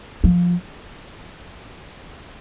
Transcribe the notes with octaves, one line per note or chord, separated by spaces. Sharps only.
F3